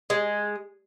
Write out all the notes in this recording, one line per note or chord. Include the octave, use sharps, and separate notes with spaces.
G#3